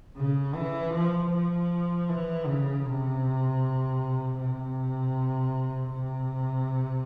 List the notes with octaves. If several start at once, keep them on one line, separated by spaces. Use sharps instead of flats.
C#3
E3
F3
F3
E3
C#3
C3
C3
C3